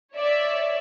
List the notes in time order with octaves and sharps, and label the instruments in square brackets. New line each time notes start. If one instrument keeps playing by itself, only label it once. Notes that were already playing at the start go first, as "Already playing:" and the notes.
[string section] C#5 D5 E5